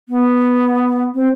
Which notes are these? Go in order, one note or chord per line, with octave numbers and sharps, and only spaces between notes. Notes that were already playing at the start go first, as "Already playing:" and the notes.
B3
C4